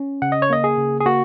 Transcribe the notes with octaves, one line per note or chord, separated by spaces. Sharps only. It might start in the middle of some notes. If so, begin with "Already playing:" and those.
Already playing: C#4
C#3 F#5
D#5
C#5
A#3 D#5
G#4
C#3
G#4
A#3 F#4